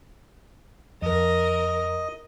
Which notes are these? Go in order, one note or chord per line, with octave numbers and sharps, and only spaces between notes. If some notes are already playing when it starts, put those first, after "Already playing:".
F2 A#4 D#5